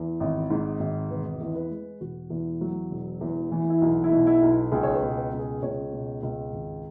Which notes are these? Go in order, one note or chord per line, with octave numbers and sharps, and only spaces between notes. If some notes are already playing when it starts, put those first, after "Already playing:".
Already playing: E2
G#1
G#2
G#1
E1 B4
E2
B4
G#3
E1 F#4
E2
F#3
E1
E2
E3
E4
B1 F#4
E4
B2
E4
B1
C#2 G#4
C#5
B4
B2
G#4
B4
C#2
G#4
C#2 C#5
B2
C#2
G#1